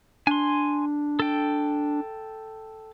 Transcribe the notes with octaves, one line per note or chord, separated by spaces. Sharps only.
D4 G#5 C6
A4 G5